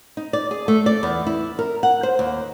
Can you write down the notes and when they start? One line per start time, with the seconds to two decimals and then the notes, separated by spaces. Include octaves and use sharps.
0.17 D#4
0.33 D5
0.51 G#4
0.68 A3
0.86 D5
1.03 E2
1.26 E4
1.59 A#4
1.83 F#5
2.03 C5
2.19 D#2